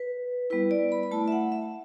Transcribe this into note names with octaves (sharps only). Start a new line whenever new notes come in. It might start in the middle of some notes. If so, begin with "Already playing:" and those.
Already playing: B4
G3 B3 E4 B4
D5
B5
B5
A3 E4 A5
E5
F#5
E5